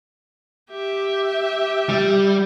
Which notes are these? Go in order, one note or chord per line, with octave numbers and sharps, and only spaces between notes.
G4 E5
G3